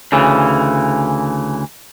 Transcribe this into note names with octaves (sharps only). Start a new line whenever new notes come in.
D2 C#3 E3